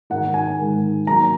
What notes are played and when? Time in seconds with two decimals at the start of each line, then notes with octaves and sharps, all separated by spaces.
0.10 G#2 D#3 G#3 D#4 A#4 F#5
0.34 G#5
0.59 G#2 D#3 G#3 D#4 A#4
1.07 F#3 A#3 D#4 G#4 A#5